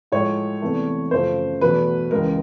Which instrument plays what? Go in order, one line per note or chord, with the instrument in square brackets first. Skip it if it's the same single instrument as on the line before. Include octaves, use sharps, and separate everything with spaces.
[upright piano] A2 F3 G#3 C#5
E2 C3 E3 A3
F#2 C#3 F3 A3 C5
E2 B2 F#3 A3 B4
C#2 C#3 E3 G#3 A#4